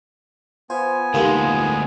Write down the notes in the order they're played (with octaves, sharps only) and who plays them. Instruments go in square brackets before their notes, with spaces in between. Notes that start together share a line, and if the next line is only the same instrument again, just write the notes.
[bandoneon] B3 G#5 [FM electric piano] F4 C5
[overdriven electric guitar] D2 G#3 [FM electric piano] A#3 F4 A4 [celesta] D#4 G4 F5